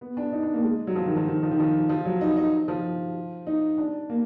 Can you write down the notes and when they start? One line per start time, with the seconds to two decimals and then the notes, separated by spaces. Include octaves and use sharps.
0.01 B3
0.17 D4
0.32 D#4
0.43 D4
0.54 A#3
0.64 G#3
0.87 F#3
0.95 F3
1.06 D#3
1.16 F3
1.27 D#3
1.43 F3
1.51 D#3
1.60 F3
1.89 F3
2.05 F#3
2.21 D#4
2.37 D#4
2.68 F3
3.47 D#4
3.78 D4
4.09 A#3